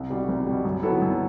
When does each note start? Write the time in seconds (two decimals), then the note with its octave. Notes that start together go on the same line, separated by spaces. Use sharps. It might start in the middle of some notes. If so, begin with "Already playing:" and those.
Already playing: C2
0.10 B2 G3
0.29 C2
0.47 B2 G3
0.65 F#2
0.83 F#3 B3 E4 A4
1.01 F#2